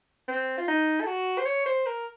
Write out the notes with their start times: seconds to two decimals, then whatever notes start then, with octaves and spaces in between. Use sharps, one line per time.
0.28 C4
0.58 F4
0.68 D#4
1.01 A4
1.07 F#4
1.38 C5
1.46 C#5
1.66 C5
1.86 A#4